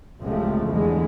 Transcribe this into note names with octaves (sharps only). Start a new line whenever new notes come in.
C#2 C3 F3 G#3 A3
E2 D3 E3 G#3